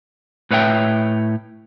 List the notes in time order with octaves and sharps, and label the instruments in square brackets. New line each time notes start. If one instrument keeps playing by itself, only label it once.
[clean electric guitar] A2 B4 C#5 E5 G5